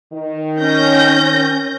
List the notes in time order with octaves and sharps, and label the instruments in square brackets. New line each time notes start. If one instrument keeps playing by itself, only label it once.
[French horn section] D#3
[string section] C#4 G6 A#6